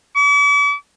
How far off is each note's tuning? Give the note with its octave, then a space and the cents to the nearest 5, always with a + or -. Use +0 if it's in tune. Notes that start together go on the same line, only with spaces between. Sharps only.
D6 -45